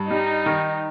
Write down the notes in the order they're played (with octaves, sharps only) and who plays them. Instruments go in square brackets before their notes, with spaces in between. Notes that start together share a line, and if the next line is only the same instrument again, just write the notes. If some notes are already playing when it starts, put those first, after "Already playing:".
Already playing: [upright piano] G2
[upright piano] G3 [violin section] D#4
[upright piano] D#3